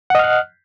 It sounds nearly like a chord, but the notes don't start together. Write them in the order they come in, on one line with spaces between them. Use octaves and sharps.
F#5 D#5 F6 F#6